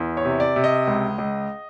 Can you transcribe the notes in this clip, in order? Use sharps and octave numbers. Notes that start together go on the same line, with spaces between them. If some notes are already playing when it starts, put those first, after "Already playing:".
Already playing: E2
C#5
C3
D5
C3
D#5
C#2
C#2